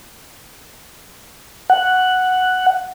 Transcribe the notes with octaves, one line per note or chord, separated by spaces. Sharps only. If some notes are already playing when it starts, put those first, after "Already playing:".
F#5